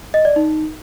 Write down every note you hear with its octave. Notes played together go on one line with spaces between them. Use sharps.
D#5
D5
D#4